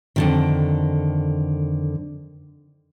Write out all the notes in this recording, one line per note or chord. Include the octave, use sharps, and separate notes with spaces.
F2 D3 D#3